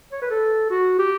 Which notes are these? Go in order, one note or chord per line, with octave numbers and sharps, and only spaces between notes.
C#5
B4
A4
F#4
G4